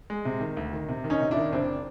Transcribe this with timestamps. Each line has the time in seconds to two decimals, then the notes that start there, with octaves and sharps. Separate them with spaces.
0.10 G#3
0.25 C3
0.41 D#3
0.57 D2
0.73 D#3
0.89 C3
1.04 D#3
1.10 C#4 D#4
1.20 C3
1.31 D4 E4
1.37 D#3
1.52 F#1 C4 D4